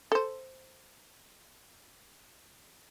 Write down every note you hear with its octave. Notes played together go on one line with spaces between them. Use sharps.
A4 C5